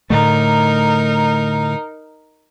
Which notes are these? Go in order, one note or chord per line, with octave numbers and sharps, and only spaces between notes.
A2 D3 A3 D#4 A#4